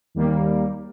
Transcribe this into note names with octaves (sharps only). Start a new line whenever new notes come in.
D#2 G3 A#3